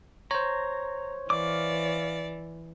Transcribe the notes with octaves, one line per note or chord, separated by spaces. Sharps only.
C5 C#5 A#5
E3 D5 F5 D6